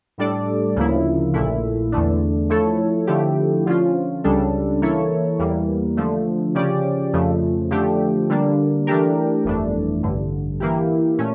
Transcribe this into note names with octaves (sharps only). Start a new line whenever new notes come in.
A2 G3 D4 A4 D5
D2 C#3 F3 A#3 E4
A#1 A#2 A3 E4
E2 D3 A3 D4
F3 A3 E4 A4 C#5
D3 F3 A3 E4 G4
D3 F3 C#4 F4
C#2 C#3 G3 D4 A4
E3 A#3 E4 A4 C#5
E2 E3 G3 A#3
D3 F3 A3
C#3 F3 C#4 G4 D5
F2 C#3 F3 A3
D3 F3 A3 D4 G4
D3 G3 A#3 D4
E3 A3 D4 G4 A#4
G1 F2 E3 A3 D4
A1 G2 D3
E3 A#3 E4 G4
A#2 A3 C#4